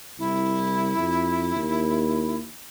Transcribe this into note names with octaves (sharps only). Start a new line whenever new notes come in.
C2 E4
F2
D#2